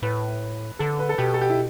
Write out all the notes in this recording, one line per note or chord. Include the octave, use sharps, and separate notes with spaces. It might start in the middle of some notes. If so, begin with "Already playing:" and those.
A2 B4
D3 A4
B4
A4
B2 G4
A4
G4
E4